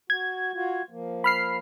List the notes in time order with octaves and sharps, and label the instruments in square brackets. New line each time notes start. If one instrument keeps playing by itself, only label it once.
[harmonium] F#4 [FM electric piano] G#6
[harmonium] F4 F#4
F3 A#3
[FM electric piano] B5 F6 C7